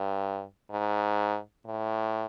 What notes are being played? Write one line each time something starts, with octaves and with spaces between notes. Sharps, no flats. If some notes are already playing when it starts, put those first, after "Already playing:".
Already playing: G2
G#2
A2